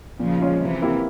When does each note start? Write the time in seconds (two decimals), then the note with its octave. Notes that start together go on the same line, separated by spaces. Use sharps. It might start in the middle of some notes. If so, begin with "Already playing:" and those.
0.20 A#2 C#3 F3
0.40 G#3 C#4 F4
0.61 C3 E3 F3
0.82 A#3 E4 G4 A#4